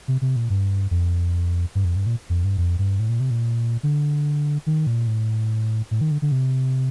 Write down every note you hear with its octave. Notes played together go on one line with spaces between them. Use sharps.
C3
C3
A#2
G2
F2
G2
F2
G2
A#2
F2
G2
F2
G2
A2
A#2
C3
A#2
D3
D#3
A#2
A2
A2
D#3
D3
D3
C3